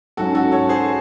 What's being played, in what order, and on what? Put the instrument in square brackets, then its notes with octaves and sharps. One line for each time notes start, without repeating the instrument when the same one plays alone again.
[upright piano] G#2 F#3 C#4 [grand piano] F#4 A4
[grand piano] F#4 A4
A4 C#5
G#4 C5